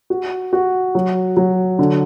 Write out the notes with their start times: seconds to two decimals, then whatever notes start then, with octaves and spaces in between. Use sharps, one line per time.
0.10 F#4
0.53 F#4
0.95 F#3
1.37 F#3
1.79 D3